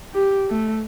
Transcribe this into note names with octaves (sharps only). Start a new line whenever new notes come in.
G4
A3